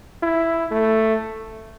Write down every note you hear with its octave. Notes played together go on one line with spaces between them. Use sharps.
E4
A3